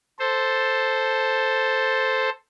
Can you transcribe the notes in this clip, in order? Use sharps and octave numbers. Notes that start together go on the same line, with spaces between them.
A4 C5